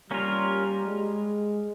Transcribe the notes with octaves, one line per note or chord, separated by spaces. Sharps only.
G3 A#3 C#4 F4 A#4
G#3